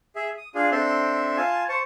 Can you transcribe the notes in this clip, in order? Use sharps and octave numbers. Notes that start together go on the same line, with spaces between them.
G#4 E5
D#6
D4 F4 G#4
C4 D4 A4 E5 C6
F4 G#5 A5
C5 A5 C#6